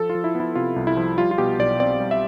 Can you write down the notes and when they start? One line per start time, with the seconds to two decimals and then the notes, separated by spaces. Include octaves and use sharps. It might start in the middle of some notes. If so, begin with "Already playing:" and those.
Already playing: F3 A4
0.10 F4
0.15 F3
0.24 E4
0.35 B3
0.40 E4
0.55 C3 F4
0.76 C2
0.87 E4
0.97 F3
1.18 G3 F4
1.31 F4
1.38 B2 G4
1.59 B1 D5
1.80 C4 D5
2.00 G3
2.11 E5